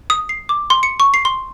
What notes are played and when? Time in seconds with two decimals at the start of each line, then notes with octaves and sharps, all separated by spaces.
0.10 D#6
0.29 C7
0.49 D6
0.70 C6
0.83 C#7
1.00 C#6
1.14 C7
1.25 C6